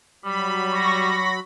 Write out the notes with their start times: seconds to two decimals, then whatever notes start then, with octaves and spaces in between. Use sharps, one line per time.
0.25 F#3 G3 B5
0.72 C#6 A#6